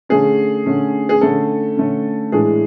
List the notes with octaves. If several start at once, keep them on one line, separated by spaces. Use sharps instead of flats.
D3 A3 C#4 G#4
D3 A3 C#4
G#4
D3 A3 C#4 A4
D3 A3 C#4
A2 E3 G#3 D4 G#4